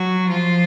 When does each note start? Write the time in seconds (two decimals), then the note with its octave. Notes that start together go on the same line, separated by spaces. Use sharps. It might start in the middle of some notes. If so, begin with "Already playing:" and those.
Already playing: F#3 F#4
0.30 F3 F4